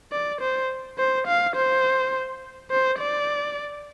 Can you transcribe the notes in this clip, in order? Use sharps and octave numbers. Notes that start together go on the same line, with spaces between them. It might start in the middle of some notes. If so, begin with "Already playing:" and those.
D5
C5
C5
F5
C5
C5
D5